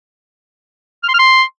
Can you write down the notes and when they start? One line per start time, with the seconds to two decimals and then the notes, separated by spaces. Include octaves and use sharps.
1.04 F6
1.09 C6
1.14 F6
1.19 C6